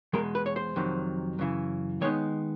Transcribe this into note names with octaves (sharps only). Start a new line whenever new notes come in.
E2 B2 G#3 A#4
B4
C#5
C5
F2 C3 D#3 F#3
F#2 C#3 E3
D#3 G#3 B3 D#4 C#5